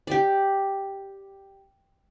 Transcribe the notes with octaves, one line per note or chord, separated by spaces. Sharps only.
G4 D5